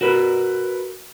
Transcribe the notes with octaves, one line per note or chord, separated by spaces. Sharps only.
F#4 A#4 B4